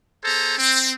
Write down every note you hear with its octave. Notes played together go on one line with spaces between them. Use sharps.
B3 G#4 A4 C5 A#5
C4